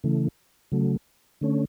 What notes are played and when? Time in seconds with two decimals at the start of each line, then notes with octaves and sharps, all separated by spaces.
0.04 C#3 E3 A3
0.72 C#3 F#3 A3
1.41 D3 A3 C#4